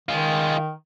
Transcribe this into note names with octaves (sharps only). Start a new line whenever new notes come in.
D#3 G#3 F4